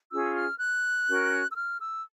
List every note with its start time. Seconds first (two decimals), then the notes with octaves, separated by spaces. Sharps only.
0.11 C#4 F4 G#4 E6
0.36 F6
0.60 F#6
1.08 C#4 F#4 A#4
1.52 E6
1.56 F6
1.80 E6